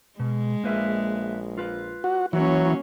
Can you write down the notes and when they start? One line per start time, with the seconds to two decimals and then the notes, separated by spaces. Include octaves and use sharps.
0.20 B2 G#3
0.64 A#1 A#3 B4 E5
1.58 F4 B4
2.04 F#4
2.33 E3 F#3 A#3 C#4 E4 F#4